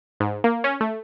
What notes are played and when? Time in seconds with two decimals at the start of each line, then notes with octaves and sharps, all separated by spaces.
0.20 G#2
0.44 A#3
0.64 C#4
0.81 A3